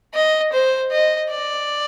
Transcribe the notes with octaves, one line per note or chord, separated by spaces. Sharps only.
D#5
C5
D#5
D5